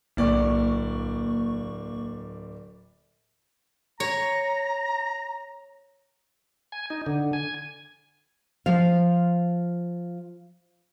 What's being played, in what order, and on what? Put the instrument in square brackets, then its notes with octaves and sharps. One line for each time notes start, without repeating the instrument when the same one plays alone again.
[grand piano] D1 D5 [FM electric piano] B1 A#3 C#6
[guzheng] C#5 [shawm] A#5
[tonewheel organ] G#5
D#4
D3
G#5
[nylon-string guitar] F3 F5